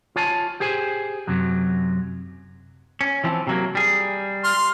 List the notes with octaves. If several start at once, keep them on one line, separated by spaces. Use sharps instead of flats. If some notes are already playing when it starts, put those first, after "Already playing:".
F4 C#5 G#5 A5
G4 G#4 C5 G#5
F#2 C3 F#3
C#4
E3 F3 C4
C3 F#3 A#3
G3 G#4
C6 F6